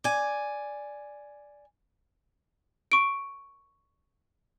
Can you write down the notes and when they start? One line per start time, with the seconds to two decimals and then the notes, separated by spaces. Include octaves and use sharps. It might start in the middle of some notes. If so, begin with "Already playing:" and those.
0.04 D5 G#5
2.92 C#6 D7